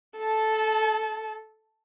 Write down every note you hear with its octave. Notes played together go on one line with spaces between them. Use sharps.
A4 A5